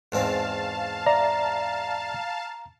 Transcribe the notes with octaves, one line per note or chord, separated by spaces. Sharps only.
E2 G#2 C4 F5 A5
D5 E5 A#5